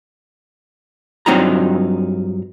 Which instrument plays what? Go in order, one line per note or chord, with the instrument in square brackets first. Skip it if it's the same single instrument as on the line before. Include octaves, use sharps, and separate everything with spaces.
[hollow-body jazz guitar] G2 F#3 C4 D#4 F4 A#5